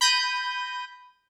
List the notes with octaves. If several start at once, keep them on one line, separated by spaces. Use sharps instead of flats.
B5 G6 A#6 D#7